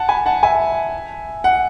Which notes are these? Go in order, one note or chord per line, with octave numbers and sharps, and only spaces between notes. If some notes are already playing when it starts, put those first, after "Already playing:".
Already playing: F#5 A5
G#5 B5
F#5 A5
E5 G#5
F#5